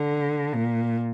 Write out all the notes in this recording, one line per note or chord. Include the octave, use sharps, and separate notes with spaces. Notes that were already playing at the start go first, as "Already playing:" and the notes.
Already playing: D3
A#2